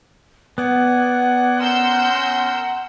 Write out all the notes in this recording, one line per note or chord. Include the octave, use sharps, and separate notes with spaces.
B3 D5 F#5 G#5
C#4 A#4 C6 E6 G6